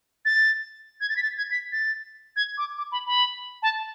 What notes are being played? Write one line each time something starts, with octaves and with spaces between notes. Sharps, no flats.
A6
G#6
A6
B6
A6
G#6
B6
A6
G#6
D6
D6
B5
B5
A5